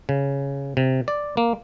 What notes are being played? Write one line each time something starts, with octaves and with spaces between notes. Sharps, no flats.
C#3
C3
D5
A#3